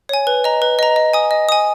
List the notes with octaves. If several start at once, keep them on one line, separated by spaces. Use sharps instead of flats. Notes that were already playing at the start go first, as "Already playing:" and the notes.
C#5 G#5
B4
D#5 A#5
B4
D#5 A#5
D#5
G#5 D#6
D#5
G#5 D#6